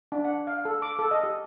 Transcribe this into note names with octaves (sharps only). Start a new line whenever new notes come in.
D4
F#5
F5
A4
D6
A4
D#5
G4